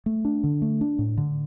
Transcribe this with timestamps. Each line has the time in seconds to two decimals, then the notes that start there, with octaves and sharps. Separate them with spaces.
0.06 A3
0.25 D4
0.44 D3
0.62 A3
0.81 D4
0.99 A2
1.17 D3